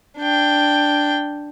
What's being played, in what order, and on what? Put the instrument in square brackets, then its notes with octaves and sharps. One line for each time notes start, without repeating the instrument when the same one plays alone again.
[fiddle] D4 G5